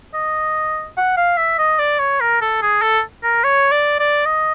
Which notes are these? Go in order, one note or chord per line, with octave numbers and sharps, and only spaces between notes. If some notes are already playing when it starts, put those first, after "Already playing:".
D#5
F#5
F5
E5
D#5
D5
C#5
A#4
A4
G#4
A4
A#4
C#5
D5
D5
D#5